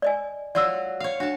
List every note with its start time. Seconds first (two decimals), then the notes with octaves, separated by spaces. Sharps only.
0.02 D5 D#5 G#5
0.55 F#3 F4 F#4 D5 E6
1.00 C#5 F5
1.20 D4 F#4 A5